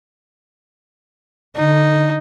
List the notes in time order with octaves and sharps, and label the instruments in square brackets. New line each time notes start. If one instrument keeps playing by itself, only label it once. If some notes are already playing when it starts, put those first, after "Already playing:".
[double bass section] D3 [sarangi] D#4